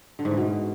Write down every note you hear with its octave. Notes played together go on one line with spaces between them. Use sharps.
D3
G#2
E3
B2